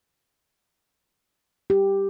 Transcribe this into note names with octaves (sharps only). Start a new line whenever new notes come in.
G4